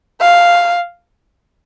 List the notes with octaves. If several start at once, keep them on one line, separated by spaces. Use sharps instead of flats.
F5